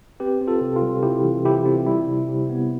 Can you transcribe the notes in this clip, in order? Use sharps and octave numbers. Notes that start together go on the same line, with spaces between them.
C4 G4 B4
C4
F4 A4
C3
F4
G3
C3 E4 G4
E3
C3 E4 G4
C4
G3 E4
C3
C3
B3